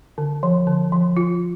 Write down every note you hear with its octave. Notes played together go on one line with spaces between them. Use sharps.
D3
F3
D3
F3
F4